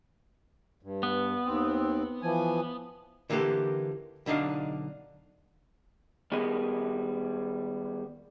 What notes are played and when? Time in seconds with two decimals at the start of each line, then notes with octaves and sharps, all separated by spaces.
0.83 G2
1.03 B3
1.45 D#2 C4
2.22 E3 F3 G#5
3.30 D3 E3 A#3 C#4 G4 A4
4.26 B1 D3 D4 D#4 F5
6.32 D#3 G3 B3 G#4 D#5